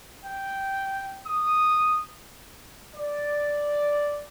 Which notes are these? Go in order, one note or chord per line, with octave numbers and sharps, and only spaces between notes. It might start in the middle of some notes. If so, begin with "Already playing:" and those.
G5
D#6
D5